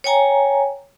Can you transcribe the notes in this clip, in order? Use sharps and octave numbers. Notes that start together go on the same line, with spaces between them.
C#5 G5 G#5 A#5